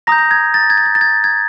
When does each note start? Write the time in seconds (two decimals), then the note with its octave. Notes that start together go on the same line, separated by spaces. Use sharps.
0.07 A#5 D#6 G6 A#6
0.18 A#6
0.31 G#6
0.54 A6
0.70 G#6
0.78 A6
0.86 G#6
0.95 A6
1.01 G#6
1.24 G#6